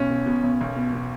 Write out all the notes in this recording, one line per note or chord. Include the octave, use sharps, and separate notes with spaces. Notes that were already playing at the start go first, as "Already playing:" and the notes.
Already playing: B1 C#4
B2
B2
B1
B1
B2
B2